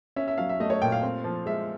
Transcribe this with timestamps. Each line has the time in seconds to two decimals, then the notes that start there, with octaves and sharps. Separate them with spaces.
0.16 C#4 E5
0.28 E5
0.38 F#3 F5
0.49 E5
0.60 A3 D#5
0.70 C#5
0.82 A#2 G5
0.92 F5
1.02 C4
1.24 F3
1.46 G#3 E5